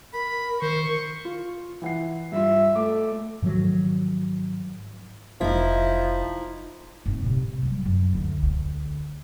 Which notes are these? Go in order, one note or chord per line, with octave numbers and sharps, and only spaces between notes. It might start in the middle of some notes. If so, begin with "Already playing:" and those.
A#4 B5
D#3 C5 C#6
F4
E3 F#5 C7
G2 F4 E5
A3 D6
G#2 D#3 F3 F#3
F1 F3 D#4 E4
G#2 C4
A2 C3
F#3 G3
F#2
D2 D3
D2